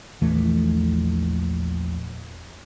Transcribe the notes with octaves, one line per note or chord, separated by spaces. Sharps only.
A#1 E2 E3 A3